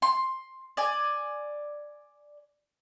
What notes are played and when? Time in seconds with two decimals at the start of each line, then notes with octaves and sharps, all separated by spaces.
0.02 C6
0.77 D5 G#5